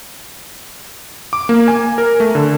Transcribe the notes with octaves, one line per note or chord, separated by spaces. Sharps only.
D6
A#3
G#5
A#4
A3
D3